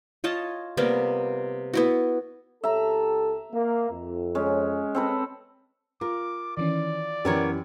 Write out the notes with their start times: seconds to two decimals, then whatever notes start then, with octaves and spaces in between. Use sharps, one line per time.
0.24 F4 C#5 D#5 A5
0.77 C3 G3 A#3 B3
1.74 B3 E4 F#4
2.64 C#2 G4 A4 E5 A#5
3.52 A#3
3.90 F2
4.35 G#3 C#4
4.95 C4 C#4 A4 B4
6.01 F4 A#4 D6
6.57 D#3 E3 C#4 D5
7.25 F#2 E3 B3 G4 A#4 C#5